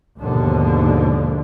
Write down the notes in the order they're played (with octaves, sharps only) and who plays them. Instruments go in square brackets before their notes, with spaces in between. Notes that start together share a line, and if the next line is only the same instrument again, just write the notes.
[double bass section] D#2 G#2 B2 D3 F3